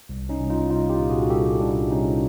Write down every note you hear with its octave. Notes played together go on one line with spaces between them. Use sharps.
C2
C#4 D#4
C2
D#4 F4
C2 D#4 F4
F4 G4
A#2
F#4 G#4
C2 G4 A4
C2 D4 E4
C2 C#4 D#4